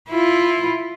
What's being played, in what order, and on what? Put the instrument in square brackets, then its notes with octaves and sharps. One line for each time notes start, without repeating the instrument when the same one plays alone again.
[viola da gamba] E4 F4